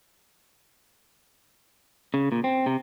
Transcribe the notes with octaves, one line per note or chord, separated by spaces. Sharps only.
C#3
A#2
C4
C3